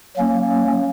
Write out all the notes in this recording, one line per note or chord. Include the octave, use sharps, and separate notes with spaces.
F#3 A#3 C#4